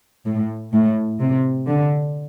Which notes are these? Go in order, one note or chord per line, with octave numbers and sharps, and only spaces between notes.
A2
A2
C3
D3